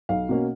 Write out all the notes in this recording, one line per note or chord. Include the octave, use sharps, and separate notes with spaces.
B1 F5
B2 A#3 C#4